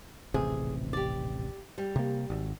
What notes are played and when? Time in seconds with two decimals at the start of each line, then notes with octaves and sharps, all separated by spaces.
0.34 D#1 A1 C3 G#4
0.93 G4 D5
1.78 G3
1.96 C3 A#3
2.30 G#1